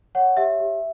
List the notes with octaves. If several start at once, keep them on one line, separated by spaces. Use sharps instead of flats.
C#5 F#5
G4 E5
G4